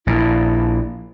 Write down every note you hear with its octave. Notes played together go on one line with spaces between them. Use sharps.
A#1 A#2 E4